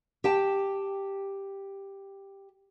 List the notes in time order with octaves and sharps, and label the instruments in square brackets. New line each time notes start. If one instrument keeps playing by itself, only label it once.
[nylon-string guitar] G4 G5 A5